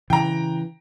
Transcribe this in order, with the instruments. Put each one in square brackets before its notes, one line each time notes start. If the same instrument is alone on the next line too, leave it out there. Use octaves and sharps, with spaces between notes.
[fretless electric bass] C#3 E3 [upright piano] G5 A#5